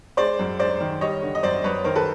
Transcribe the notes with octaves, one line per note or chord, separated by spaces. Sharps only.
G#3 C5 D5
F#2
G#3 C5 D5
D#3
G3 C#5 D#5
D3
D#5
F#2 C5 D5
F#2 B4 C#5
D#3 A#4 C5
A4 B4